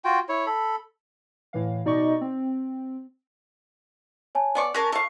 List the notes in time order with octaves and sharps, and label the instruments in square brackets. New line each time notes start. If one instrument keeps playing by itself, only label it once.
[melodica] F4 F#4 G5
E4 C#5
A4 B5
[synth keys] A2 E3 F5
B2 D#4 D5 D#5 C#6
C4
[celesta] C#5 G#5 A5
[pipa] B3 D5 C#6
[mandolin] C#4 A#4 A5 [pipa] G#4 [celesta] F#6
[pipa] A4 F5 [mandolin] C#6